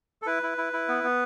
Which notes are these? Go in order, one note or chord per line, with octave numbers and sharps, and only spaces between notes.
A4
E4 B4
E4
E4
E4
B3
B3